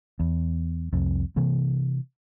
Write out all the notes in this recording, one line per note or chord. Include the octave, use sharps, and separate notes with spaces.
E2
C2 F2
C3 E3 A#3